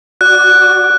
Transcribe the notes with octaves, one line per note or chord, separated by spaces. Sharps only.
F#4 D5 F#6